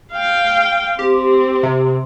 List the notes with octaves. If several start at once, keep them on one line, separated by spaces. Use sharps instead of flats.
F5 G5
C4 G4
C3